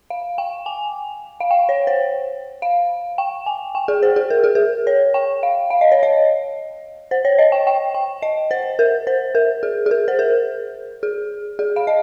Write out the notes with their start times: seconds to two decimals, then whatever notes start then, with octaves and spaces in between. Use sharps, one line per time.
0.10 F5
0.38 G5
0.66 G#5
1.40 F5
1.51 G5
1.69 C#5
1.87 C5
2.62 F5
3.18 G5
3.46 G#5
3.75 G5
3.88 G#4
4.03 C5
4.16 G#4
4.30 A#4
4.44 G#4
4.55 A#4
4.87 C#5
5.14 G5
5.43 F5
5.70 F5
5.81 D#5
5.92 C#5
6.03 D#5
7.11 C5
7.25 C#5
7.38 D#5
7.52 G5
7.67 G5
7.94 G5
8.22 D#5
8.51 C5
8.79 A#4
9.07 C5
9.35 A#4
9.63 G#4
9.86 G#4
9.91 A#4
10.08 C5
10.19 A#4
11.03 G#4
11.59 G#4
11.76 F5
11.87 D#5